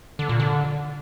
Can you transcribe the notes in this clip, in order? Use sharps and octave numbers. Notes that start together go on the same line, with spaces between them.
D3
A#2
D3